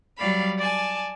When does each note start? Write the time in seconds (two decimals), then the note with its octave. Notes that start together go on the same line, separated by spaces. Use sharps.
0.17 F#3 G3 D5 F5 B5
0.59 D5 G#5 A5